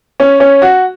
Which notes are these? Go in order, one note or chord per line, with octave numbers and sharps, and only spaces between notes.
C#4
C#4
F#4